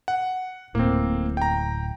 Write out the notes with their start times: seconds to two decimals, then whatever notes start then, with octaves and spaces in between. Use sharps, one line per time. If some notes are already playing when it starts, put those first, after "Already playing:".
0.08 F#5
0.75 D1 A2 A#3 C4
1.37 G5 A#5